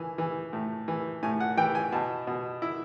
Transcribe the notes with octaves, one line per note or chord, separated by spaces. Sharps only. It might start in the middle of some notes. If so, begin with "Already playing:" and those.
Already playing: E3 G#5
E3
A2
E3
A2 G#5
F#5
E3 G5
G#5
B2 A5
B2
E4